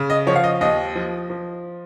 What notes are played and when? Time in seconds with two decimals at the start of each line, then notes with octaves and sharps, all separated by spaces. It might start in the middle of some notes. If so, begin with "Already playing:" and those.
Already playing: C#3
0.10 D#5
0.27 F3 C#5
0.36 F5
0.44 D#5
0.61 D#2 D#5
0.95 F3
1.30 F3